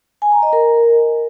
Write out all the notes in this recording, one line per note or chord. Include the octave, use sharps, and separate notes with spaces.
G#5
A#5
D#5
A#4